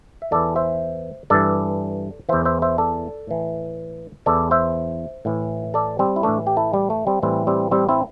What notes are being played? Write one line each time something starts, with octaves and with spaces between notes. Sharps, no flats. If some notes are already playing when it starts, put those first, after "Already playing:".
E5
E2 E3 A4 D5
C5 E5
G2 E3 A4 D5
E2 E3 C5 E5
C5 E5
C5 E5
A4 D5
A2 E3
E2 E3 A4 D5
C5 E5
A2 E3
A4 D5
G3 C4
E4
A2 E3 A3 D4
G4
E4 A4
G3
A3
G3 C4
A2 E3 G3 C4
G3 C4
G3 C4
C4 E4